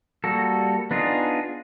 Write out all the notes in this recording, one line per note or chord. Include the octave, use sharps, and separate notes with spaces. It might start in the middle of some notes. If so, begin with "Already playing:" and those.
G3 A#3 F#4 A4
B3 D4 D#4 F4 G#4